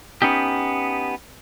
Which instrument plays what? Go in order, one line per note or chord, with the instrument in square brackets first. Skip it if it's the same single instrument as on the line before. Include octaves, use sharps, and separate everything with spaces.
[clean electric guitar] B3 C#4 D#4 G4